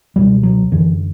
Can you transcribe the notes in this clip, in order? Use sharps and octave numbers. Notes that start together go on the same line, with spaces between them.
C#2 B2 G3
F#3
F#2 D3 E3